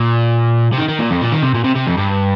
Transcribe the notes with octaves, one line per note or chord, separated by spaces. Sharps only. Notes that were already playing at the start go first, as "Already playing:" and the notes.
Already playing: A#2
C3
D#3
D#3
A#2
F2
A#2
D#3
C3
A#2
C3
C3
F2
G2